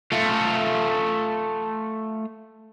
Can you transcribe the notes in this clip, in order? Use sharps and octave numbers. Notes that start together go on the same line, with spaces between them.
A3 F4